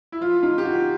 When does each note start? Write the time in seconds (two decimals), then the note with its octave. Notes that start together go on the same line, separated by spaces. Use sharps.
0.12 E4
0.21 F3 F4
0.43 D#4 F4
0.58 G4
0.65 F3 F#4